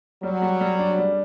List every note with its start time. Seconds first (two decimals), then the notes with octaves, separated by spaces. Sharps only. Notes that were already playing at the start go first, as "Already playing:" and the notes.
0.23 F#3 G3
0.42 G3
0.61 G3
0.79 D4
0.98 G3